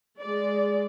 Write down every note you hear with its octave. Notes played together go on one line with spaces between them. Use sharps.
G#3 D5